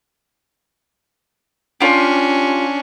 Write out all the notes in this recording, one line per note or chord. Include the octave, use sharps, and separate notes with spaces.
C#4 D4 F4 G4